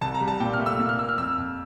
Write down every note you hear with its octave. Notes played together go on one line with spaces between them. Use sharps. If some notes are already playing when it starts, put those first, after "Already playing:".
C2 A5
A#5
G3
A5
A#2 G5
F6
A3
E6
A#2
F6
A#3 E6
F6
F2 E6
F2